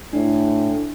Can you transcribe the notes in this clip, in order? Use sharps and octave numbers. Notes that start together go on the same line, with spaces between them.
A2 D4